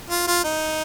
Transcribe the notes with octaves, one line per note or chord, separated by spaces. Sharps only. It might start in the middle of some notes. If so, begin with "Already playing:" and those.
F4
F4
D#4